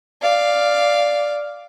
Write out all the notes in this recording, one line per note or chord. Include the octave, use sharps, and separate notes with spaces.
D5 F5